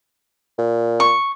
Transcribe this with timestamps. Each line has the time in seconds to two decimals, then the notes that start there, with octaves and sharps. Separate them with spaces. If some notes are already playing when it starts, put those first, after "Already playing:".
0.58 A#2
1.00 C#6